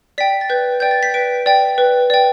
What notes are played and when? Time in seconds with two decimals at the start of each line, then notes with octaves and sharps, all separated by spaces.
0.18 D5 G5 B6
0.41 A6
0.50 B4 G6
0.80 D5 G5 G6
0.91 A6
1.03 B6
1.14 B4 D7
1.46 D5 G5
1.78 B4
2.10 D5 G5